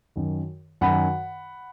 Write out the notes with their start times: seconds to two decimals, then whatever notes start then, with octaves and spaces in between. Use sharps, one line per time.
0.16 F#2 D#3
0.81 F#2 D#3 F#5 B5